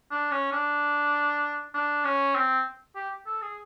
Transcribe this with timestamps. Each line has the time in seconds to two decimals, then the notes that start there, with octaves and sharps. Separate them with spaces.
0.11 D4
0.31 C#4
0.52 D4
1.74 D4
2.05 C#4
2.35 C4
2.96 G4
3.27 A4
3.42 G#4